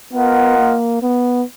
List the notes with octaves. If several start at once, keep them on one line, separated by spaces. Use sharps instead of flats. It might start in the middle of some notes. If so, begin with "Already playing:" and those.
B3 F4 A#4 D#5 F#5
A#3
B3